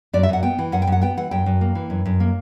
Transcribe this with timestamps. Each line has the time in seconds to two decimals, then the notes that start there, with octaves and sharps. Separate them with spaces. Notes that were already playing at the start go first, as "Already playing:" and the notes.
0.13 F#2 D5
0.23 E5
0.29 F#2 F#5
0.43 B3 G5
0.59 E3
0.72 F#2 F#5
0.82 G5
0.87 F#2 F#5
1.02 B3 G5
1.17 E3 F#5
1.31 F#2 G5
1.46 F#2
1.61 A#3
1.75 E3
1.90 F#2
2.05 F#2
2.20 A#3